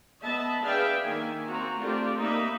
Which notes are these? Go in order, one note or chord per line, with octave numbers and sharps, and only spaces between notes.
B3 D#5 E5 A5 B5
D4 G#4 B4 E5 F5 G5
D#3 A#3 E5 G#5
A#3 C4 F#4 A#5
A3 C4 D4 F4 G4 A4
A#3 D#4 E5 B5